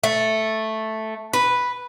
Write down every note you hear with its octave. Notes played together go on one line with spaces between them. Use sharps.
A3
B4